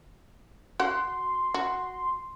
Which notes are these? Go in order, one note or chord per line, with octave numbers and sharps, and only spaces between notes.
F#4 F#5 C6
F#4